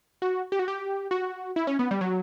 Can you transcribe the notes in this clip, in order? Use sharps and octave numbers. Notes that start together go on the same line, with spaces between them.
F#4
G4
F#4
G4
F#4
E4
C#4
B3
G3
F#3